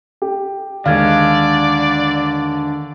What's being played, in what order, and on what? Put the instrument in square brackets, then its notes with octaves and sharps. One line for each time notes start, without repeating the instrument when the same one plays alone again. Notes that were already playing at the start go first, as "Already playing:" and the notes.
[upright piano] G4
[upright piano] D#2 G#3 [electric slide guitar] D3 [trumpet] D5 [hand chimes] F5 F6 G#6